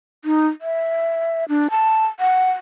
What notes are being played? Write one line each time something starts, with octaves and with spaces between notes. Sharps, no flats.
D#4
E5
D4
A5
F#5